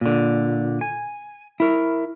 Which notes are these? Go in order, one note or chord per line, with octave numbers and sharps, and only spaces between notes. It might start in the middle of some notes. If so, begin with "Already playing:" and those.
A#2 D3
G#5
E4 A#4